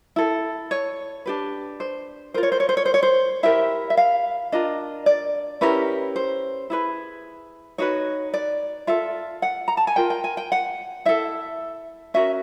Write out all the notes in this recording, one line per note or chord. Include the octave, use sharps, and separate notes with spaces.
E4 A4
C#5
D4 G4 B4
C5
F4 A#4 C5
C#5
C5
C#5
C5
C#5
C5
C#5
C5
E4 G4 A#4 E5
E5
F5
D4 F4 A#4 D#5
D5
C#4 E4 G4 A#4 B4
C5
E4 G#4 B4
D#4 F#4 B4 C#5
D5
F4 A4 E5
F#5
A#5
A5
G#5
F4 A#4 G5
G5
G#5
G5
F#5
E4 A4 E5
C#4 F#4 A#4 E5